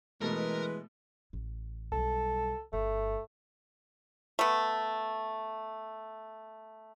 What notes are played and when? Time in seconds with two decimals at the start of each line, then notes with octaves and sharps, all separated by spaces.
0.22 B2 E3 G#3 A3 A#4 B4
1.33 A1
1.92 B1 G3 A4
2.73 G1 A3
4.39 A3 B3